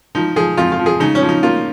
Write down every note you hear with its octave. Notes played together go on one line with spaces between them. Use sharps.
F3 D#4
F3 G#4
F2 F4
F4
F3
G#4
C#3 D#4
C#4
F3
D#4
A#3 F4